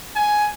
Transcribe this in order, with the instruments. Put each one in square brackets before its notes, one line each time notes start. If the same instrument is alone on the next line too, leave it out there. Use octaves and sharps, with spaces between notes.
[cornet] G#5